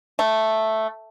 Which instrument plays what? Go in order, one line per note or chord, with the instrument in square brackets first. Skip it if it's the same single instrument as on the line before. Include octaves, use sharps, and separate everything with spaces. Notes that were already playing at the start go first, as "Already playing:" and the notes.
[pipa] A3